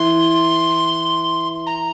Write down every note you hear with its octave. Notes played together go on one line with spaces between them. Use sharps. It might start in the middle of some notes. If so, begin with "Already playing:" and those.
Already playing: E3 C6
A#5